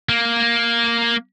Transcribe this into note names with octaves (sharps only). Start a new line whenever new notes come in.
A#3